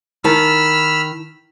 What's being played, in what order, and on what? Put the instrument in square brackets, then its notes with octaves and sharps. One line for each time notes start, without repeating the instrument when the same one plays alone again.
[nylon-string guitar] D#3 A5 [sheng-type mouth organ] B5 E6 F6